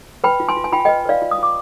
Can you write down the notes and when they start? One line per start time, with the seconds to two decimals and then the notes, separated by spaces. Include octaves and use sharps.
0.24 B4 G5 B5
0.40 F4
0.49 G#5 C6
0.57 F4
0.64 G#5
0.72 F4 G5 B5
0.80 G#5
0.85 B4 D#5 G5
1.05 B4 D5 F5
1.22 F4
1.31 D#6
1.38 F4 D6